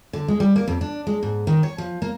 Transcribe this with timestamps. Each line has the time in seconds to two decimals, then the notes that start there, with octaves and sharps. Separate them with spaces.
0.13 D3
0.28 G#3
0.40 G3
0.56 A#3
0.68 F2
0.81 D4
1.07 G#3
1.23 G#2
1.47 D#3
1.63 C#5
1.78 F3
2.02 A#3